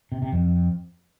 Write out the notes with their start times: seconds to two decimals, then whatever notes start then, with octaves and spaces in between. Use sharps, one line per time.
0.12 C3
0.22 C3
0.32 F2